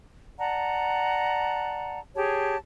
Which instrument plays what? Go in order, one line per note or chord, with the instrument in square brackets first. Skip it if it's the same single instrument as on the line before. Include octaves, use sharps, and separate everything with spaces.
[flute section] D5 F#5 A5 A#5
G4 G#4 C#5 A5